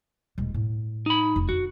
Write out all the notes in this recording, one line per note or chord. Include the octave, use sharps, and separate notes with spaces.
D#1 G#3
A2
D#4 B5
F1
D3 F#4